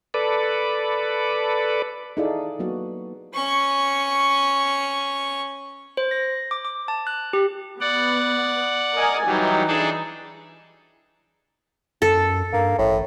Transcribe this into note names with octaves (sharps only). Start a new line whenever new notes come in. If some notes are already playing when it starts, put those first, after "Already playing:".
A4 B4 D5
D#4 E4 G#4 A4 D5 F5
F#3 A#3 B3 F#4
C#4 C#6
C5
A#6
D6
D6
A5
F#6
G4
B3 D5 F#5
A#4 D#5 G#5
E3 F#3 G3 D#4
D4 G#4 A4
F#2 A4
G2 A#3
A1 A2